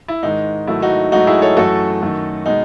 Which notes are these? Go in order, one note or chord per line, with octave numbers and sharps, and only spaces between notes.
E4
G#2 D#3 G#3 D#4
G#2 D#3 F#3 A3 E4
D#4 F#4
G#2 F#3 A3 D#4 F#4
E4 G#4
A4 C#5
F#2 E3 A3 F#4 A4
F#2 D#3 A3
B2 G#3 D#4